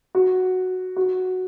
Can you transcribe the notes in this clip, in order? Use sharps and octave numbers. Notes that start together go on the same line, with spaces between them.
F#4
F#4